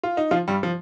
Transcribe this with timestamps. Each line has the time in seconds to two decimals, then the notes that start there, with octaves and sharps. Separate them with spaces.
0.04 F4
0.17 D#4
0.31 F3 F4
0.48 G2 G3
0.63 F3